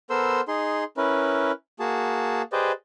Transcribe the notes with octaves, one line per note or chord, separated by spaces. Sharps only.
B3 A4 A#4 C5 C6 E6
D#4 G#4 C6
C#4 E4 A#4 B4
A#3 F#4 G#4 A5
G4 G#4 B4 C5 D5 D#5